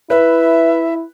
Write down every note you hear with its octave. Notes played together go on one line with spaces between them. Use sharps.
E4 B4 E5